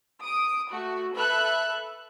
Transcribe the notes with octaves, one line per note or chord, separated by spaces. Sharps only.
D#6 D7
A3 F#4
A4 B4 E5 F#6